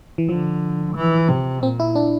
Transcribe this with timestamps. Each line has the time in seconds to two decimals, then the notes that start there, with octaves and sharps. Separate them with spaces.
0.18 E3
0.29 D3 F3
0.95 E3
1.28 C3
1.62 A#2 C4
1.80 E4
1.95 D4